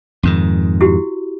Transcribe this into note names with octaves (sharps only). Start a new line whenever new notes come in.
F2 G#2 D#3
E4 F#4 G4